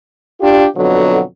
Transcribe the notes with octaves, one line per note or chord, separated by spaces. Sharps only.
D4 F4 G4
F2 B2 D3 F#3